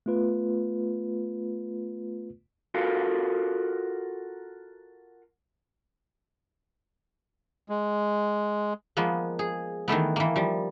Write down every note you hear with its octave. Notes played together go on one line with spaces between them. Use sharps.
A3 B3 F4 B4
F4 F#4 A4 A#4 F5
G#3
F3 G#3 A#3 B3
G#4
D#3 E3 A3 B3
E3 A#3
F3 G3